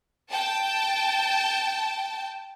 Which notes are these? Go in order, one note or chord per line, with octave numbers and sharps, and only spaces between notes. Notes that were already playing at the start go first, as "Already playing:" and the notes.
G5 A5